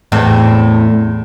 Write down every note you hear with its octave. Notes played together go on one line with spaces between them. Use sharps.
E2 A2 C4